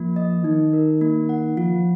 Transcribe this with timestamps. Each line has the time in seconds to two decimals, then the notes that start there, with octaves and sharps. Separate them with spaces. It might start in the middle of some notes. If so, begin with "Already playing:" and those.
Already playing: F3 A#3
0.16 D#5
0.44 D#3 D#4
0.73 A#4
1.01 A#3
1.29 F#5
1.57 F3 F4